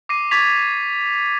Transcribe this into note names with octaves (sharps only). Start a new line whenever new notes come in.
D6 A#6 C7 D#7
C#6 D6 G#6 A6 B6 F7